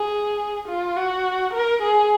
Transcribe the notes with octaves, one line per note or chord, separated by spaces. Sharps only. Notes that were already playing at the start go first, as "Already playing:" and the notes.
Already playing: G#4
F4
F#4
A#4
G#4